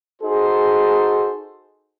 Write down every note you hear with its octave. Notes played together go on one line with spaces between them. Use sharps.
D#4 F#4 G#4 A4 C5